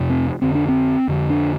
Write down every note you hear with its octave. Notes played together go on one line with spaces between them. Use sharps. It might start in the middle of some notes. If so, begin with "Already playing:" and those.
Already playing: F2 C3
C4
F2 D3 C4
D4
C4
F2 D3
D4